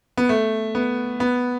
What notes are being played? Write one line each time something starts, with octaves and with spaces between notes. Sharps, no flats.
B3
A3
B3
B3